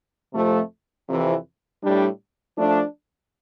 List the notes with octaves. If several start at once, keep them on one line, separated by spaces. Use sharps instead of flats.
F2 C3 F3 A3
F2 C3 E3
A2 G3 D4
F3 A3 D4